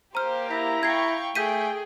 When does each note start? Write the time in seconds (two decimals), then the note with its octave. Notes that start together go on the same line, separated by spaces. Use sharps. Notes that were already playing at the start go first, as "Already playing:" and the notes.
0.15 A#3 G4 C5 A#5 F6
0.51 E4 A#5 B6
0.83 F5 G5 C#6 G#6 C7
1.35 A3 G#4 G5 G6 B6 D#7